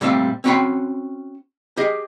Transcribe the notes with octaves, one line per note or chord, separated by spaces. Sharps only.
A#2 G3 A3 C4 E5 F5
C4 C#4 F#4 G5 B5 C6
G4 G#4 D#5